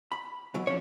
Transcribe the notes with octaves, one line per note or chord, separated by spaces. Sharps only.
B5
B2 E3 F#3
F2 C#4 D4 C#5